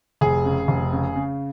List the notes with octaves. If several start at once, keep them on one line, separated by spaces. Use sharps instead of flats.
F1 G#4
C#3
F1
C#3
C#3